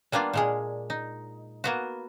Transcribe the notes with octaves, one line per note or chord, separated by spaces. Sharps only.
G3 A#3 B3 D4 F4
A#2 G#3 G#4
D#4
A#3 B3 F#4